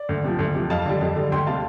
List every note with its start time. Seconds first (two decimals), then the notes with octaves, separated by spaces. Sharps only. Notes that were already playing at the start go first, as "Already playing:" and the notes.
Already playing: D5
0.09 D2
0.24 C3 F3
0.39 D2
0.55 C3 F3
0.70 F2 F5 A5
0.85 D3 G3
1.01 F2
1.16 D3 G3
1.32 D2 G5 C6
1.47 C3 G3 F5 A5